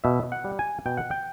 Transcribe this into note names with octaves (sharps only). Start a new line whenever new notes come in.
B2 E5
F#5
G3
G#5
B2 G5
F#5
G5